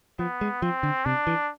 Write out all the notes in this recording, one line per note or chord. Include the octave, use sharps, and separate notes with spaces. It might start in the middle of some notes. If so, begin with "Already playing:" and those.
F3 B3
G#3
F3 C4
D3
C3 D4
E3